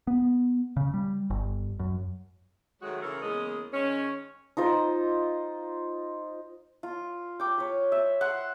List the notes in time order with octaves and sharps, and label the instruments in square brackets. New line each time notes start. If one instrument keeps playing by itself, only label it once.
[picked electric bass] B3
C#3
G3
G1
F#2
[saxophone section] D#3 F#3 G#3 A3 F#4
C#3 E3 A4 A#4
E2 C#3 G#3 A#3 D#5
D#3 G#3 C#4
[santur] D#4 F4 C5 D#5
F4
G5 D6
B4 C#5
E5
F#5 C6